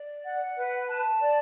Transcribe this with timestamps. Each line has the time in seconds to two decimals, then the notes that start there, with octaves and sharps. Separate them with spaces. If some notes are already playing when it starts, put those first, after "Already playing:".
Already playing: D5
0.24 F#5
0.56 B4
0.89 A5
1.20 D5